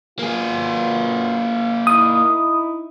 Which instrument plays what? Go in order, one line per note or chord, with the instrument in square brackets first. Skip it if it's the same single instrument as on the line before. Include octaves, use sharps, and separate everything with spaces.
[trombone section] F#3 B3 F4 [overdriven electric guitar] A#3 G#4
[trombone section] D#4 E4 [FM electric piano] D#6